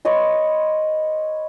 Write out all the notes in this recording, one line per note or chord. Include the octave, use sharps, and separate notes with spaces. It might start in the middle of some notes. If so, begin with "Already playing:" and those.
B4 C#5 D#5 C6